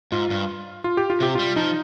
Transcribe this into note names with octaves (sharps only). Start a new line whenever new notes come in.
G#2 F4
G2
F4
G4
F4
C3 G4
G3 F4
F3 D#4